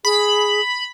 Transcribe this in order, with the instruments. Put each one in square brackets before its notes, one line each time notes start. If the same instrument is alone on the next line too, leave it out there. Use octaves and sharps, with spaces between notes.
[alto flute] G#4 [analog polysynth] B5